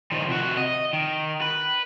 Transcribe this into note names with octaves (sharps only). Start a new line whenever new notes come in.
D#3 F3
C3 F#4
D#5
D#3
B4